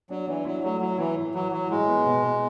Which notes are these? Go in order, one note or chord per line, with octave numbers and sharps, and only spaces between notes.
F#3 D4
E3 D4
F#3 E4
F#3 A3
F#3 E4
E3 E4
A2
E3 F#3
E3 F#3
A2 G#3
B3
B2
B3